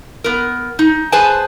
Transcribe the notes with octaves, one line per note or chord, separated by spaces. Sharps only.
B3 A#4
D#4
G#4 B4 C5 G#5 A5